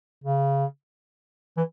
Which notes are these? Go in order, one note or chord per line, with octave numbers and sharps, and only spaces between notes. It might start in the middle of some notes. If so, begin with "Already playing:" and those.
C#3
E3